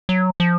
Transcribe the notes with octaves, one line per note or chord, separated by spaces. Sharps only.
F#3
F3